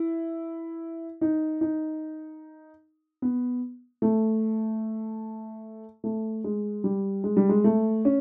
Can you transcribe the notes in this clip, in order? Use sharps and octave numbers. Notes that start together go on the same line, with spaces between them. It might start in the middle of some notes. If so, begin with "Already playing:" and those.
Already playing: E4
D#4
D#4
B3
A3
A3
G#3
G3
G#3
G3
G#3
A3
C#4